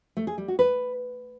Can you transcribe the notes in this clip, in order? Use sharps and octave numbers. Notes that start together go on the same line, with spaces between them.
A3
G#4
G3
F#4
B4